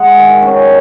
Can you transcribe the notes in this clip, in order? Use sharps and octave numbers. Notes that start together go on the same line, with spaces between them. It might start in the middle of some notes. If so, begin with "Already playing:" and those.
Already playing: G#3 F#5 G#5
D#3
C#4